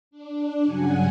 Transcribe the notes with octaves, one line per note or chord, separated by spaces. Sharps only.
D4
G2 C#3 F#3 F#5 G#5